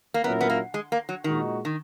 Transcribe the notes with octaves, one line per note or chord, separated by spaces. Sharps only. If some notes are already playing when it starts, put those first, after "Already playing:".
A#3
A#2 F#3 B3 C#4 E4 A#4
B3
A#3
G#3
A#3
F#3
A#2 D#3 G#3 D#4 F#4
D#3